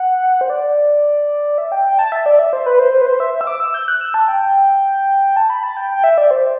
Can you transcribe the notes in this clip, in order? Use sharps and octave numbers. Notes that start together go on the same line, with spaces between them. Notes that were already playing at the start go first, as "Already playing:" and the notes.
Already playing: F#5
C5
D5
E5
G5
G5
A5
E5
D5
E5
C5
B4
C5
C5
B4
C5
E5
E5
E6
D6
E6
G6
F#6
E6
A5
G5
A5
B5
A5
G5
G5
E5
D5
C5